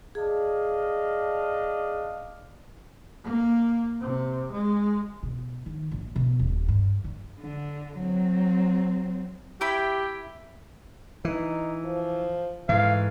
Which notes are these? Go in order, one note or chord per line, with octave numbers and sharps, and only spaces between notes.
D4 G#4 D#5 F5
A#3
C3
G#3
B2
D#3
A#1
B2
D#1
G2
D3
D3
F#3 C4
E4 G4 G5 B5
E3 D#4
F3
G#2 E3 A3 F5